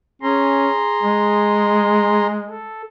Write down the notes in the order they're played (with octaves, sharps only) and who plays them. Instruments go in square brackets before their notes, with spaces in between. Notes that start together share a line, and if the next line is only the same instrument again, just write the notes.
[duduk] C#4 [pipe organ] G#4 A#5 C6
[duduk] G#3
[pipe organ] A4